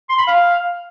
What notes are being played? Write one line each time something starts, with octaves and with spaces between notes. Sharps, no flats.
C6
B5
F5